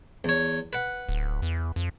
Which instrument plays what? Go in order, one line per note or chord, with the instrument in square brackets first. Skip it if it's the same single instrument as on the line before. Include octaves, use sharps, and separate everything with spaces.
[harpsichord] E2 C#5
B4 F#5
[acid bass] D1
E2
F2